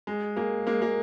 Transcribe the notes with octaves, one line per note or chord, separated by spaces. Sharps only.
G#3
G#3 A#3
G#3 A#3
G#3 A#3